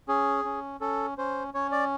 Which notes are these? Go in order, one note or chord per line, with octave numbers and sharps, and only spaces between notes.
C#4 G#4
C#4
C#4 A4
C#4 C5
C#4 C#5
D5